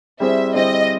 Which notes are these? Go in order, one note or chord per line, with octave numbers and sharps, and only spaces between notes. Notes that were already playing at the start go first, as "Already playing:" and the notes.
G3 C4 E4 G#4 C5 E5
G3 C4 E4 G#4 C5 D#5